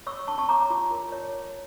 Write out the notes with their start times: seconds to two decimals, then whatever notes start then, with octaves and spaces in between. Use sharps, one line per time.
0.07 C#5 C#6 E6
0.28 D4 A5 C#6
0.38 A5 C#6
0.49 C#5 A#5 D6
0.70 F4
0.91 A#4
1.12 C#5
1.33 C#5